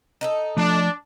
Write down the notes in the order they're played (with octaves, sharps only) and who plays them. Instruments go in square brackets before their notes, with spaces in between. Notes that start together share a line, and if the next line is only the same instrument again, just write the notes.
[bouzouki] D#4 E4 A4
[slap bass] F3 A3 [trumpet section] D4